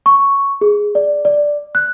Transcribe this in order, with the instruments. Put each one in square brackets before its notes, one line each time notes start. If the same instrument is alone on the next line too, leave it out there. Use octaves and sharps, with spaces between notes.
[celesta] C#6
G#4
D5
D5
F#6